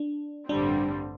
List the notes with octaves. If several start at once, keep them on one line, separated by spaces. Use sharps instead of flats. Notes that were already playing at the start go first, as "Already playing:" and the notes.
Already playing: D4
A1 G2 D3 G3 C4 D4